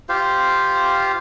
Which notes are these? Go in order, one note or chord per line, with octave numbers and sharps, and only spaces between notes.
F4 G4 C5 F5